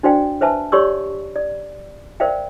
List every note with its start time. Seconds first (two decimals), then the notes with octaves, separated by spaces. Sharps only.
0.03 D4 F#4 C5 D5 F5 G5
0.41 B4 C5 E5 G#5 A5
0.72 G4 C#5 D5 C6 C#6 E6
1.36 D5
2.20 A#4 C5 D5 E5 F5 G5